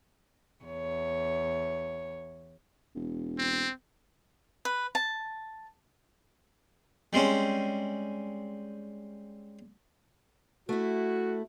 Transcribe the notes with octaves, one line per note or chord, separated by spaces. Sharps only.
E2 C#5
E1
C4
B4
A5
G3 G#3 C4 C#4
A3 E4 F#4